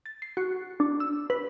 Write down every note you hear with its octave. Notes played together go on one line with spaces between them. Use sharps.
A6
C7
F#4
D4
E6
B4